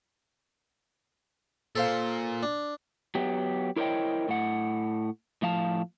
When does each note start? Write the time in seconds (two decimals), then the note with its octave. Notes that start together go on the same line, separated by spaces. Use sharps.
1.76 A#2 A4 C5 F5
2.43 D4
3.15 F#3 B3 G4
3.76 E4 A#4 C5 C#5 D#5 G5
4.29 A2 F#5
5.42 A2 F3 F5 A5